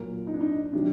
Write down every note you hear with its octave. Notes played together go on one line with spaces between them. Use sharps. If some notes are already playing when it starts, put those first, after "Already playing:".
Already playing: A#2 F#3 A#4
D#4
D4
D#4
C3 D#3 F#3 D4